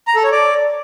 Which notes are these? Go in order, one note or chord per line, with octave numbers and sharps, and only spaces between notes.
A#5
A4
C#5
D5